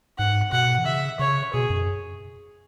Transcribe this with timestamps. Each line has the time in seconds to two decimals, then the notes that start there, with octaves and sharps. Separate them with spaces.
0.18 G#2 F#5
0.52 B2 F#5
0.78 E3
0.86 C#3 E5
1.19 C#3 C#5
1.53 B2 G#4
1.70 F#2